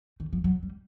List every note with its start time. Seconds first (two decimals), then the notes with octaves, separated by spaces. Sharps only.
0.20 D#3
0.33 F3
0.44 F#3
0.63 G3